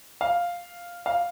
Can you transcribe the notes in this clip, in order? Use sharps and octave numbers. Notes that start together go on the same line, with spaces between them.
F5
F5